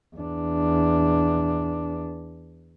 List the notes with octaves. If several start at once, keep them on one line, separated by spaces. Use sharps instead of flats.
E2 D4